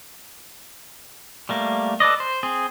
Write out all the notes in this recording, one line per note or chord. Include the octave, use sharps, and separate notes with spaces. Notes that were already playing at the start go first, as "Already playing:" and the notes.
G3 A3 A#3
A4 B4 D5 D#5
C5
C4 G#4